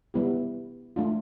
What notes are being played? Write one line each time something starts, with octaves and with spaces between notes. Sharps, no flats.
G3 B3 E4 G4
A3 D4 F4